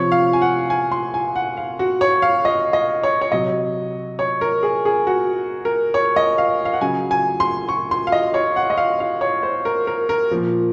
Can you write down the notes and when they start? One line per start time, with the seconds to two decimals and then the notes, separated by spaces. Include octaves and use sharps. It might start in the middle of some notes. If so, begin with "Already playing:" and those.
Already playing: C3 F3 C#5
0.12 F5
0.33 G#5
0.42 F#5
0.70 G#5
0.92 C6
1.14 G#5
1.36 F#5
1.57 F5
1.79 F#4
2.01 C#5
2.22 F5
2.45 D#5
2.73 D#5
3.03 C#5
3.21 C#5
3.32 C3 F#3 D#5
4.19 C#5
4.41 A#4
4.63 G#4
4.85 G#4
5.07 F#4
5.65 A#4
5.94 C#5
6.16 D#5
6.38 F5
6.65 F5
6.73 F#5
6.81 C#3 F#3 G#5
7.11 G#5
7.40 C6
7.69 C#6
7.91 C6
8.07 F5
8.12 D#5
8.34 C#5
8.56 F#5
8.70 D#5
8.77 F5
9.00 F5
9.21 C#5
9.43 C5
9.65 A#4
9.87 A#4
10.09 A#4
10.31 A#2 F3